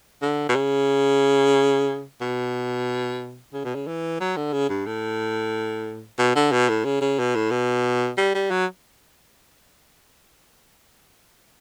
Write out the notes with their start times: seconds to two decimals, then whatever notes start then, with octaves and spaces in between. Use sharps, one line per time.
0.22 D3
0.49 B2
0.55 C#3
2.21 B2
3.53 C#3
3.65 B2
3.75 C#3
3.87 E3
4.20 F#3
4.36 D3
4.53 C#3
4.69 G2
4.86 A2
6.18 B2
6.35 D3
6.52 B2
6.69 A2
6.85 C#3
7.01 C#3
7.19 B2
7.35 A2
7.51 B2
8.17 G3
8.34 G3
8.51 F#3